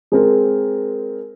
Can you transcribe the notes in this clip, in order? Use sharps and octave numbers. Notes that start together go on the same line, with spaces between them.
G#3 C4 A#4